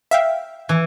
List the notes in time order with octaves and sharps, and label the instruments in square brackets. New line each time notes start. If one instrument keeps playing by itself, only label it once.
[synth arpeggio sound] E5 F5 G5
[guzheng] E3